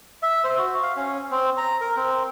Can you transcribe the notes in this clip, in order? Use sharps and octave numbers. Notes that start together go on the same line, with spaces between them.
E5
C5
F#4
F5
C#4
C4
A#5
A#4
C4